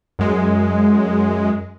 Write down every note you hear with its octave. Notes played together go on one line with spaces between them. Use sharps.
F#2 G#3